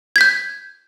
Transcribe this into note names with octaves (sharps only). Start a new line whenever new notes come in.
G6 G#6 B6